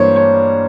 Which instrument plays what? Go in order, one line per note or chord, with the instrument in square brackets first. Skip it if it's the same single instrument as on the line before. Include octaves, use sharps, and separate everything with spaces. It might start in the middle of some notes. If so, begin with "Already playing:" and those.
Already playing: [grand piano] G2 E3 G3 A#3 D4 [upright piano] C5 C#5
[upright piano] C#5